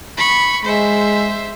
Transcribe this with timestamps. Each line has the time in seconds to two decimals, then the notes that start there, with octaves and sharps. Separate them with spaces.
0.17 B5 C#6
0.65 G#3 C5 E5